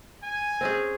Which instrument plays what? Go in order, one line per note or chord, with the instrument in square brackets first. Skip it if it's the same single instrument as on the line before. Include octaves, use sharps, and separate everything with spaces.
[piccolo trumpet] G#5
[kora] C4 C#4 G#4